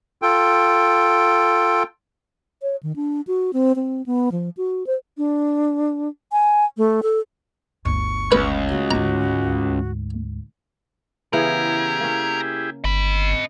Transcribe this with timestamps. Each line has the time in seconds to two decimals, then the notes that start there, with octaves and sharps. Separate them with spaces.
0.22 F4 A4 G5
2.62 C#5
2.83 D#3
2.96 D4
3.27 F#4
3.53 C4
3.76 C4
4.06 B3
4.32 F3
4.57 F#4
4.87 C5
5.18 D4
6.32 G#5
6.78 A3
7.03 A4
7.85 G1 D2 C#6
8.32 C#2 B4
8.71 F#4
8.91 D2 G#2 A#5
11.33 C#3 E3 B3 E4 G4 G#4 A#4
12.00 A#3 C#4
12.84 G1 D#5 B5